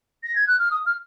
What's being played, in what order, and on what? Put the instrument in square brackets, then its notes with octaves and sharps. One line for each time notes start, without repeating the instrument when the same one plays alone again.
[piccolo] A#6
G#6
F#6
F6
D#6
F6